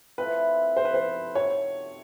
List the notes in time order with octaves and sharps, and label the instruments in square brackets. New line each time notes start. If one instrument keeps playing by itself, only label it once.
[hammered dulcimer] F3 A3 C4 E4 [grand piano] B4
[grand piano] C5
B4
C5
[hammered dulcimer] C3 D#3 F#3 [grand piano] C#5